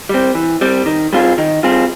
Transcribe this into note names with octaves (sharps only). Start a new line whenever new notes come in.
G3 C4
E3
G3 C4
D#3
G3 C4 F4 G#4
D#3
G3 C4 F4 G#4